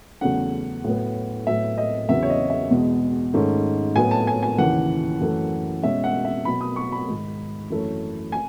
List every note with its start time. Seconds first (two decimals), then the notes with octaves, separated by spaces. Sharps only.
0.21 E2 C#3 F#3 A3 C#4 F#5
0.84 A2 F#3 B3
1.46 A2 F#3 B3 E5
1.78 D#5
2.09 E2 C#3 F#3 B3 E5
2.23 C#5
2.30 D#5
2.50 E5
2.71 E2 B2 G#3
3.34 G#2 D#3 A3 C#4
3.95 A2 F#3 B3 G#5
4.11 A5
4.27 G#5
4.43 G#5
4.58 D#2 C#3 E3 F#5
5.21 F#2 E3 A3
5.83 B2 G#3 C#4 E5
6.04 F#5
6.25 E5
6.45 B2 F#3 B3 B5
6.61 D#6
6.76 C#6
6.92 B5
7.08 G#2 D#3 G#3
7.70 F#2 E3 A3 C#4
8.32 G#5